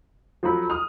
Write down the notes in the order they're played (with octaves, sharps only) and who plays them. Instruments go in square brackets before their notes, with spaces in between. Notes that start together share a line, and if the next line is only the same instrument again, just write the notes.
[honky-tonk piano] F3 F#3 [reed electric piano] F4 A4 B5
[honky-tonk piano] D#6 F6